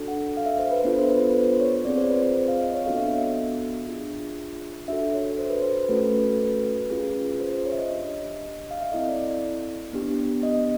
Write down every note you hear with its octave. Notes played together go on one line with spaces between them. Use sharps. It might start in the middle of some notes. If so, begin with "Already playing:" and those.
Already playing: D4 F#4 A4
F#5
F5
E5
C5
B4
B3 D4 F4 A4 C5
C5
B4
B4
C5
C#5
C4 F4 G#4 D5
C5
B4
C5
F5
D#5
C#5
B3 D4 F#4 A4 F5
E5
D#5
E5
D4 F4 G#4
D4 F#4 A4 E5
C#5
C5
B4
C5
A3 C#4 F#4 A4 B4
B4
C#4 F4 G#4
C5
C5
C#5
E5
D#5
D4 G4
F5
E5
C4 E4 A4 D#5
D5
B3 D4 G4
D#5